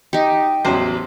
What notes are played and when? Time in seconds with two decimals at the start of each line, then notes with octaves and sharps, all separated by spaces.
0.13 D#4 G4
0.65 A1 E2 F#3 C5